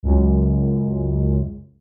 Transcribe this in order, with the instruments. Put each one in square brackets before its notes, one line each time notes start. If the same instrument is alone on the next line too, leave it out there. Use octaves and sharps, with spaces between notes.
[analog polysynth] C#2 F#2